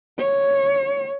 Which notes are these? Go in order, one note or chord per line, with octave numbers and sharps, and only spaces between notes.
C#5